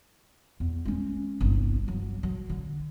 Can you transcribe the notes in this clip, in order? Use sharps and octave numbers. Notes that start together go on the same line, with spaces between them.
E2
G#3 C#4
G1 C2
F#3
F#3
D3